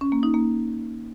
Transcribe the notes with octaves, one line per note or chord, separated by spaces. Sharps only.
C#4
A#3
D#4
A#3